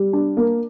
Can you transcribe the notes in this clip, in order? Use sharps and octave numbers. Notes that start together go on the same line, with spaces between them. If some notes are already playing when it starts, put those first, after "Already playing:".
Already playing: G3
D4
A#3